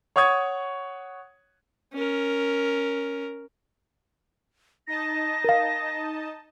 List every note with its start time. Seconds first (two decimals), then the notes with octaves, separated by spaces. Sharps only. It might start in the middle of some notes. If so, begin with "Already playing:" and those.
0.16 C#5 F#5 C#6 D#6 G#6
1.94 C#4 A#4
4.87 D#4 D#5 A5 A#6
5.44 A#4 F5